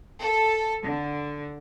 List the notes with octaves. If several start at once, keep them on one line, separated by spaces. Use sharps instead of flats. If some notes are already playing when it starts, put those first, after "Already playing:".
A4
D3